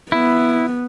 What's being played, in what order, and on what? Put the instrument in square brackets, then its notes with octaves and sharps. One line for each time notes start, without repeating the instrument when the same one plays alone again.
[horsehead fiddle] B3 [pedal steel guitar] E4